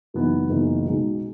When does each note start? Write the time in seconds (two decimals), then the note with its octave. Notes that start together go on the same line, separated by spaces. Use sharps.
0.14 F#1 F#2 E3 B3 D#4
0.50 F#1 F#2 E3 B3 D#4
0.85 B1 B2 G#3 D#4